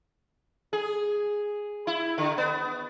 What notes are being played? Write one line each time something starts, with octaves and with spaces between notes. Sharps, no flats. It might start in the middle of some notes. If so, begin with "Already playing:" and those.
G#4
E4
D3
B3